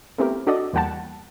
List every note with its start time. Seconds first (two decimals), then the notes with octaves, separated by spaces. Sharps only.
0.18 A3 B3 C4 E4 G4 A#4
0.47 D4 F#4 A4 D5 D#5
0.73 E2 G3 A#3 F#5 G5 A5